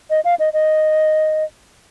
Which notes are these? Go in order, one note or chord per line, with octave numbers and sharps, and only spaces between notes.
D#5
F5
D#5
D#5